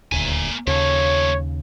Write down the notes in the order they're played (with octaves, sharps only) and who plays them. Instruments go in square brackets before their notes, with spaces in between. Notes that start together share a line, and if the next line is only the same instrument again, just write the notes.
[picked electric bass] D#1 D2 [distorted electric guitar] A#3 G#5
[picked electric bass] D#2 C#3 [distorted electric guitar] F3 A3 [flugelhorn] C#5